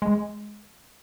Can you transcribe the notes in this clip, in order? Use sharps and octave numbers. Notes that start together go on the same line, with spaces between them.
G#3